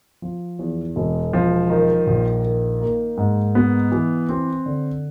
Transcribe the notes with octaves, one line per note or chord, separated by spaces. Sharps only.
F3
E2
E1
F3
D#3
A#1
D#3
A#3
G#2
B3
E3
C4
D3